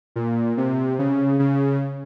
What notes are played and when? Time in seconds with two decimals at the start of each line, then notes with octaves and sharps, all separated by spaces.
0.16 A#2
0.57 C3
0.99 C#3
1.39 C#3